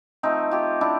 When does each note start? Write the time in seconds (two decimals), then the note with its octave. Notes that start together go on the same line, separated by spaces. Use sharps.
0.23 F3 A3 C4 D#4
0.51 F4 G4
0.81 D4 E4